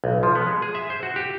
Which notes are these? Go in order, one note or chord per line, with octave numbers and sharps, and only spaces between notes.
B1
F3
B3
G#3
G#4
E5
C5
F#4
G4